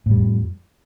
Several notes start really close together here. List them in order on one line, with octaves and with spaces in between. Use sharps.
A2 G3 F2